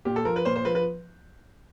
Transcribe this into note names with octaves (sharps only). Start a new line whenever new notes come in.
A#2 G4
A4
F3 A#4
B4
A#2 C5
C5
F3 B4
B4